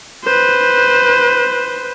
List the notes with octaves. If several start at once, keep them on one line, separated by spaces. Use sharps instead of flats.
B4 C5